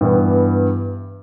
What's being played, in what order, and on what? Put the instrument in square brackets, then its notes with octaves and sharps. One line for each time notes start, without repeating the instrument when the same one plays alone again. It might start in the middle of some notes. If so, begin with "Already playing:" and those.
[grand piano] G2 E3 B3